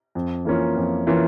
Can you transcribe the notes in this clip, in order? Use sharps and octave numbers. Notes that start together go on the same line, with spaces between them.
F2
E3 A#3 C#4 F4
F2
E3 A#3 C#4 F4